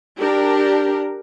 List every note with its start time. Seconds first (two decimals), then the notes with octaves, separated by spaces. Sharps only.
0.18 D4 G4 A#4